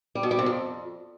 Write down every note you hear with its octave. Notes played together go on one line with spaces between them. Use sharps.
G3
B2
G3
C3
F2